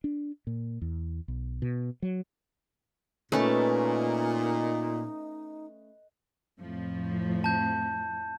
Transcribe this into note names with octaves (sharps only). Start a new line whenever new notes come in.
D4
A#2
E2
B1
B2
F#3
A#2 A3 C#4 D#4 B4 D#5 A5 B5
F2 A2 F3
A5 G6